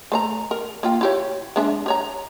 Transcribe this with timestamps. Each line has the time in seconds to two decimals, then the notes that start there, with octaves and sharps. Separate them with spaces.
0.12 A3 C5 A#5
0.51 A#4
0.83 A#3 F4 G5
1.01 E4 G4 C#5
1.56 G#3 D4 E5
1.86 G4 C#5 A#5